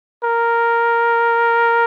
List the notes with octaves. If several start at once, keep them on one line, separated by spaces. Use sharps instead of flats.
A#4